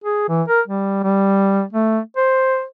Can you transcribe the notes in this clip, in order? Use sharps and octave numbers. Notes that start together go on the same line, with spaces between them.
G#4
E3
A#4
G3
G3
A3
C5